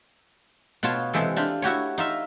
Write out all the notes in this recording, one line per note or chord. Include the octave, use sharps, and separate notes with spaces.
B2 B3 F4 C#5 A5
C3 E3 G#3 G4 A4
D4 F4 G4
E4 F#4 G4 C#5
D#4 F4 E5